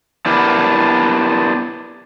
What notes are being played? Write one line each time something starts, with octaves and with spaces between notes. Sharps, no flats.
B3 D4 E4 G4 A#4